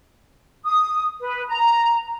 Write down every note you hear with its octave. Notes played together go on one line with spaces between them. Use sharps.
D#6
B4
A#5